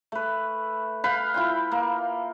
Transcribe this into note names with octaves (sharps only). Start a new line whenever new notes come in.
A3 B4
B4 F5 G5 B5
E4 F4 G5
A#3